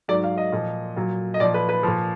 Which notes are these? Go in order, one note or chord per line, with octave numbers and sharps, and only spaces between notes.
G#2 F#3 D5
F5
D#5
A#2 F3
A#2 F#3
D#5
A#2 F3 D5
B4
B4
A#2 F3